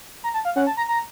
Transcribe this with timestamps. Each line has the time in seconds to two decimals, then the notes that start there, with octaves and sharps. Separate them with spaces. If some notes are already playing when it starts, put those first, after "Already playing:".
0.24 A#5
0.34 A5
0.45 F5
0.56 C#4 F#5
0.67 A5
0.77 A#5
0.89 A#5